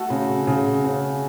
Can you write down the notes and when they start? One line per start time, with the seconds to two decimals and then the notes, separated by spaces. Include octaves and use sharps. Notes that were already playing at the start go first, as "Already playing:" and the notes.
Already playing: A3 F#4 A4
0.10 C#3
0.47 C#3
0.84 C#3